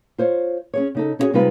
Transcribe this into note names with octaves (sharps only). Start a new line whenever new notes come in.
F4 C5 C#5
C#4 G#4 C#5
C#3 D#4 A4
C#4 E4 F#4 G#4 C#5
C3 G3 G#3 D#4 F4 B4